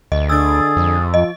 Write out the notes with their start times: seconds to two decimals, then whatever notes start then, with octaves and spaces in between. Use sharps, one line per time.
0.12 D2 D#5
0.29 D3 G#4 E6 A6
0.77 F2
1.14 F3 D#5